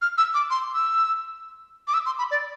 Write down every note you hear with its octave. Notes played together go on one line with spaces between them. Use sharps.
F6
E6
D6
C6
E6
D6
E6
C6
B5
D5